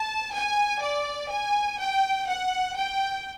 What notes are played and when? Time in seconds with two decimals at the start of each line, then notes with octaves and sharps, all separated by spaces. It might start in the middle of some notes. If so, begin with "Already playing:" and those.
Already playing: A5
0.33 G#5
0.81 D5
1.30 G#5
1.79 G5
2.28 F#5
2.77 G5